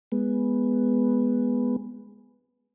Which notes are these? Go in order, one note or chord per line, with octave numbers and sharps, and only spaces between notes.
G#3 B3